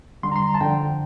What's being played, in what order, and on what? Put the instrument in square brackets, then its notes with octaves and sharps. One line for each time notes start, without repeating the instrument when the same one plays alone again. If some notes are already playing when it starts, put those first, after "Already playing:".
[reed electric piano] E2 D3 G3 C6
A#5
C6
A#5
A5
F2 D3 F3 G5